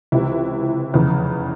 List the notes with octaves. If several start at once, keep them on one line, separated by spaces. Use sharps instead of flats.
C#2 C3 E3 E4
F1 E2 C#3